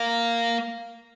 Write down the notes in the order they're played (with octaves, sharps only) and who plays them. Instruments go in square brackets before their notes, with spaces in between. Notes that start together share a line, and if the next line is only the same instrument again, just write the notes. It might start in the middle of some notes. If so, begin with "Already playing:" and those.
Already playing: [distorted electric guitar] A#3